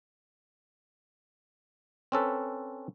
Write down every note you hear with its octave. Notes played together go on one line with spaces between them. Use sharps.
C4 C#4 A4 B4